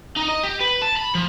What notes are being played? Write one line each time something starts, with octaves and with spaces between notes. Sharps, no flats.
D#4
D#5
G4
B4
A5
B5
F3